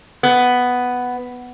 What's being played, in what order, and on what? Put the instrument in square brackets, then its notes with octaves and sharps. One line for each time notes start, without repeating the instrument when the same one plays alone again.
[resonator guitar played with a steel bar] B3